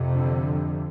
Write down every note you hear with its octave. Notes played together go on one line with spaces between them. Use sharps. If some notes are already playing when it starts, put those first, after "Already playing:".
Already playing: F2 C3
D3